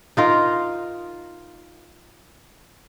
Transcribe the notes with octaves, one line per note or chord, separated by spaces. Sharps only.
D#4 F4 A#4